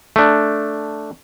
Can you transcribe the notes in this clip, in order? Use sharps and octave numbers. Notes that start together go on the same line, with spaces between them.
A3 D4